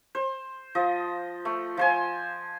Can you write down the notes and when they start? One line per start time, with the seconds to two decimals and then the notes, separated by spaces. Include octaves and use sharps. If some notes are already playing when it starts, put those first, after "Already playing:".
0.15 C5
0.75 F3 D#5
1.45 A3
1.77 F3 C5 G#5